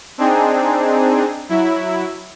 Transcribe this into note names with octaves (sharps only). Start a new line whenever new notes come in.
C4 D4 D#4 G#4
F#3 E4